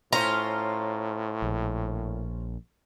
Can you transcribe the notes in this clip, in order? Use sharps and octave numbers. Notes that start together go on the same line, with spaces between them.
A2 C#4 F4 C5 A#5
A#1